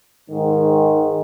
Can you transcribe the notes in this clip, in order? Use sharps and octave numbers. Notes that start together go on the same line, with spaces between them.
G#2 D#3